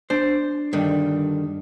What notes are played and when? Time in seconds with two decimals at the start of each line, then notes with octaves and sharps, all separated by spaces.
0.10 D4 C5
0.73 G2 D3 D#3